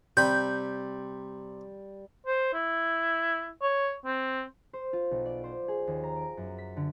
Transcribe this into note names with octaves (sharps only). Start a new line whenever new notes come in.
C3 G3 B5 G6
C5
E4
C#5
C4
C5
F4
B1
D5
C5
G#4
D#2
A#5
D7
F#2
B6
D3